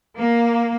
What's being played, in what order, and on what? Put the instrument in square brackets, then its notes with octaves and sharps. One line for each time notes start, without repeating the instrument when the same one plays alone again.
[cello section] A#3